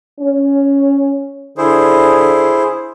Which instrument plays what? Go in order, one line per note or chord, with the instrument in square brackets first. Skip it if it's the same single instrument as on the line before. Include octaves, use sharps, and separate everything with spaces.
[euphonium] C#4
[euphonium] D3 [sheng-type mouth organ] E4 G#4 C5